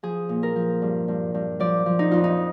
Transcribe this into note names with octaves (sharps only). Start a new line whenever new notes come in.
F3 G#4
A#2
A#4
F3
G2
G2
G2
F3 D5
F3
D#4
F2 F4
D#4